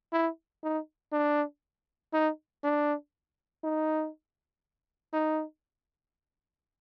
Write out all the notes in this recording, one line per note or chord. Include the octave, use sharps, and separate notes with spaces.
E4
D#4
D4
D#4
D4
D#4
D#4